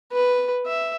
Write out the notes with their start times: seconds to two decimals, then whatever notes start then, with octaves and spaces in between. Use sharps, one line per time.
0.12 B4
0.66 E5